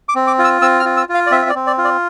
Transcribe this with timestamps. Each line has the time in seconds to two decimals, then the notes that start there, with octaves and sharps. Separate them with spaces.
0.09 D6
0.15 C4
0.27 D6
0.39 F4
0.44 E6
0.62 C4 E6
0.80 F6
0.85 F4
0.97 E6
1.09 F4
1.14 F5
1.27 D5
1.31 C4 E5
1.42 E5
1.49 D5
1.55 C4
1.67 D5
1.78 F4
1.84 D5